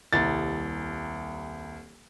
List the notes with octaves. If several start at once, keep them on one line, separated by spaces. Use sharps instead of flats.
D#1 C2 A6